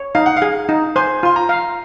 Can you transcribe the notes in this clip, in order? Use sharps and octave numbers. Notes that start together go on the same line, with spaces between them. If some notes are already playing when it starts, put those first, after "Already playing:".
Already playing: C#5
D#4 F5
F#5
F5
G#4
D#4
C5 G#5
F4 C6
A#5
F5